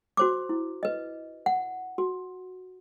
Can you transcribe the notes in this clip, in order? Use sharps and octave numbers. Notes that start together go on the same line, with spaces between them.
F#4 C5 D6
E4
B4 D#5
F#5
F#4